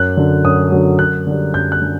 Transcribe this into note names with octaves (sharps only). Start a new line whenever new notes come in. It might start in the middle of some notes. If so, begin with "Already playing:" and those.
Already playing: F#2 F#6
D3 F#3
F#2 D#6
D3 F#3
F#2 F#6
D3 G3
F#2 G6
F#6
D3